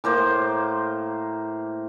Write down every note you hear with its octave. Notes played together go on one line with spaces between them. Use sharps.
A2 A#3 C5 D6